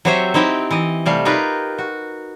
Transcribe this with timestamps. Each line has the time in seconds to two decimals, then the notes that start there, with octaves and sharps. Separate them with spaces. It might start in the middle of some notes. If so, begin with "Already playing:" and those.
0.05 F#3 C4 G4 C5 C#5 E5
0.34 C4 D#4 E4 G4 G5
0.71 E3 D#5
1.06 C3 G3 A3 F5
1.25 D#4 F4 G4 A#4 B4
1.78 F#4